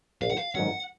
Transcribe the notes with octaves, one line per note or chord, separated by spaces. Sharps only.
A#1 F5
F#5
F5
G#2 D#3 F#3 C#4 F#5